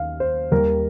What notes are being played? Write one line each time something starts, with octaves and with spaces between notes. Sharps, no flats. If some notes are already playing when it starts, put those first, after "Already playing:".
Already playing: D#2 D#3 F5
C5
D#2 D#3 G3 A#4